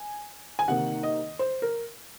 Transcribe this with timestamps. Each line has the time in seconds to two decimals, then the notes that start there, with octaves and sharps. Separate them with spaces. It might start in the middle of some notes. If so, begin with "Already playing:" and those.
Already playing: G#5
0.59 G#5
0.68 C3 D#3 A#3 D#4 F#5
1.03 D#5
1.39 C5
1.62 A#4